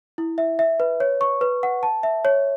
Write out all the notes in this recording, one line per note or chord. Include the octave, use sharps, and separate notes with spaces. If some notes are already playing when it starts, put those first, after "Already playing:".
E4
E5
E5
B4
C#5
C#6
B4
F#5
A5
E5
C#5